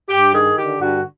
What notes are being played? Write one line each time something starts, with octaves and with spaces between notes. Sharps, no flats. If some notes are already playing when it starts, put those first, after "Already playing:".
G2 G4
D#3 G#4
D3 G4
G2 F#4